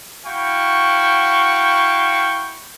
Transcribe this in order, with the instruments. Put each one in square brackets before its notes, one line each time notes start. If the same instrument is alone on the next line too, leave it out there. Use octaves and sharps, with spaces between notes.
[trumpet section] E4 F#4 F5 G5 C#6